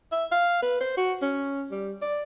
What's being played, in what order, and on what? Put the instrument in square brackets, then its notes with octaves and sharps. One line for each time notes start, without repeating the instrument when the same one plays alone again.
[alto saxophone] E5
F5
B4
C5
F#4
C#4
G3
D5